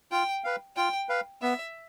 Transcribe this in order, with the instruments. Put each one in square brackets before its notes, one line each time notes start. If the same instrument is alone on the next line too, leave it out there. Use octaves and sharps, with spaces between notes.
[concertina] F4 [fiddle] G5
[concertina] B4 F5
[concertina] F4 [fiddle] G5
[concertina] B4 F5
[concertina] B3 [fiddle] E5